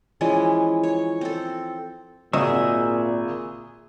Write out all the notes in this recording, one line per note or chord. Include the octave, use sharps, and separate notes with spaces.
E3 F3 G#3 C#4
C#5
C4 A4
G#1 A#2 F#4 G#4 D#5 E5